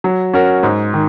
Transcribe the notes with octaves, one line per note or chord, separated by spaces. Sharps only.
F#3
C#4 F#4 A#4
G#2
D#3